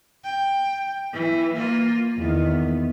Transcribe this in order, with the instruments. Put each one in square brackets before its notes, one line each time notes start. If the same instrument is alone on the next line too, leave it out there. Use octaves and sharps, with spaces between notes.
[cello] G5
E3
A#3 F4
[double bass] E2 D#3 [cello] B3